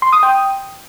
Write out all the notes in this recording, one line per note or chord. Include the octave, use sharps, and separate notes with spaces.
C6
D#6
G5